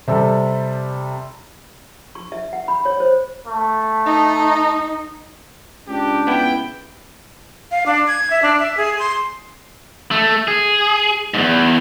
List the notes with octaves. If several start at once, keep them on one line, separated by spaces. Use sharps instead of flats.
C3 G3 A4
C#6
E5
F#5
B5
C#5
C5
A3
D#4
C#2 D4 G4
B3 E4 G5
F5
D4
G#6
E5
D4
E5
G#4
C6
A3
G#4
E2 G#2